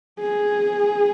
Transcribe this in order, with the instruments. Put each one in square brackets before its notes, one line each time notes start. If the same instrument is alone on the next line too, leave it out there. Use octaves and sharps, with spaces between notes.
[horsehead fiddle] G#4